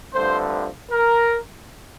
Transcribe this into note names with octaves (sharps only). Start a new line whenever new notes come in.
G2 D3 F3 A3 C4 C5
A#4